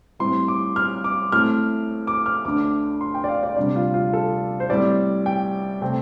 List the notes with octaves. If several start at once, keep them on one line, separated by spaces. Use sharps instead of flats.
A2 G3 C4 C6
D6
F6
D6
A2 A3 C4 F6
D6
F6
D2 D3 A3 D4 D6
C6
G5
D5
F5
D5
D2 C3 G3 D4 D5
F4
F4
A4
C5
A2 G3 C4 D5
G5
C3 A3 C4 G5